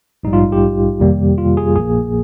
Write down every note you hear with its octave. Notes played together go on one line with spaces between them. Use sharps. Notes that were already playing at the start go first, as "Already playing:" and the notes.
A#1 G#2 G3 D#4
F4
G4
F2 C3 D#3 G3 A#3
F4
G#4
A#1 A#2 F3 A#3 G#4